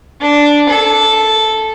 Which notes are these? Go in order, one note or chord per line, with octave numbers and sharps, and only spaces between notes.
D4
A4